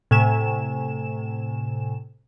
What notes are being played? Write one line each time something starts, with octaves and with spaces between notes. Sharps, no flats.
A2 C3 G#5 E7